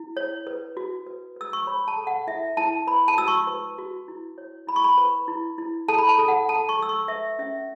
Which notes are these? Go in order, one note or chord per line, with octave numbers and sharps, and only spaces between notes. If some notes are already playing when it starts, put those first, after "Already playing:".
Already playing: E4
C#5
B4
F#4
B4
B4 E6
C#6
C#5 B5
A5
A4
F#5
E4 E5
E4 A5
B4 B5
A5
F#4 E6
C#6
B4
F#4
E4
C#5
E4 B5
C#6
B5
B4
E4
E4
A4 A5
B5
A5
A4
F#5
A4 A5
C#6
A4 E6
C#6
B4 E5
C#4 E5